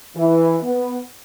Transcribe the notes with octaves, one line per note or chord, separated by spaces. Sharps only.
E3
B3